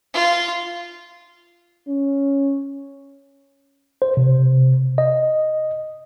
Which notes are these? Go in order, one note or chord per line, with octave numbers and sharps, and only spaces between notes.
F4
C#4
C5
C3
D#5